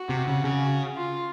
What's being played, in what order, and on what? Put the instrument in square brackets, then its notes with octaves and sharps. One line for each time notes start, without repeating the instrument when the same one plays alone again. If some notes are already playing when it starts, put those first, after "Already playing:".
Already playing: [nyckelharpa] F#4
[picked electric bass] C3
C#3
C#3
[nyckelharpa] F4